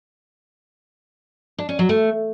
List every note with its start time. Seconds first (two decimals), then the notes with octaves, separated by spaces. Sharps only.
1.58 D4
1.69 C#4
1.79 F#3
1.89 A3